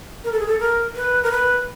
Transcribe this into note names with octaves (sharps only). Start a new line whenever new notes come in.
A#4
A4
G#4
A4
A#4
B4
A#4
B4